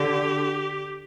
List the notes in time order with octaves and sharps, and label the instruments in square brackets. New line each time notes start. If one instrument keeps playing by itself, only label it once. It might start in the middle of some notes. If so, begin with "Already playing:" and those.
Already playing: [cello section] D3 [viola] G4